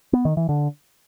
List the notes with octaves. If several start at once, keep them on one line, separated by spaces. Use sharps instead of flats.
B3
D#3
E3
D3